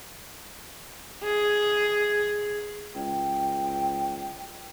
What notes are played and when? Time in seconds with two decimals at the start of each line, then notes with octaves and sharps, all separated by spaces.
1.24 G#4
2.95 C#2 G5